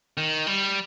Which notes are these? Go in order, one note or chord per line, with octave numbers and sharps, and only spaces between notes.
D#3
G3